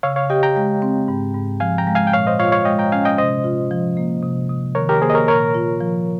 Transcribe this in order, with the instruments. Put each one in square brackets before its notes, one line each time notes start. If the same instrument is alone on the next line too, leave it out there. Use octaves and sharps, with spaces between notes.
[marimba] C#3 [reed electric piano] C#5 F5
[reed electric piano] C#5 F5
[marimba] G4 [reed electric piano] D#5 G5
[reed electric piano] G5 A#5
[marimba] G#3
C4
G#2
G#2
[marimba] F3 [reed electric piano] F5 G#5
[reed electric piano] G5 A#5
[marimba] G#3
[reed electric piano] F5 G#5
G5
[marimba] A#2 [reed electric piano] C#5 F5
[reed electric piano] C5 D#5
[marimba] F4 [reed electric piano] C#5 F5
[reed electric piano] C#5 F5
[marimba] G#3 [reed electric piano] D#5 G5
[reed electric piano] G5 A#5
[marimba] C#4 [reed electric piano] F5 G#5
[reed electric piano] D#5 G5
[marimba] C3 [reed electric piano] C5 D#5
[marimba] F4
F3
A#3
C3
C3
[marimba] D#3 [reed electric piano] A#4 C#5
[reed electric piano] G4 A#4
[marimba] A#3 [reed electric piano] G#4 C5
[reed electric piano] D#5
A#4 C#5
[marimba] A#2 [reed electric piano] A#4 C#5
[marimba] F4
F3